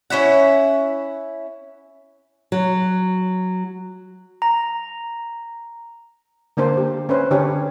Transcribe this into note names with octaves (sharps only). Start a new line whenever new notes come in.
C#4 E4 E5 F#5
F#3
A#5
D3 A#3 D4 C5
G4
C#4 B4 C5
D3 C#4 D4 G4 C#5